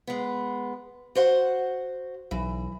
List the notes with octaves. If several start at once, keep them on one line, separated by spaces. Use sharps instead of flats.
G#3 B3
F#4 C5 F#5
B1 E3